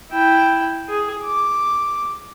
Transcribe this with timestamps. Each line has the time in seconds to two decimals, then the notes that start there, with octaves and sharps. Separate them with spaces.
0.11 E4 G5
0.88 G#4
1.24 D6